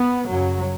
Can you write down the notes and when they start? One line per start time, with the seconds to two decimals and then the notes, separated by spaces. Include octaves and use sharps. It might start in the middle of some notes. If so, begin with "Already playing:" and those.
Already playing: B3
0.29 F#2 C#3 F#3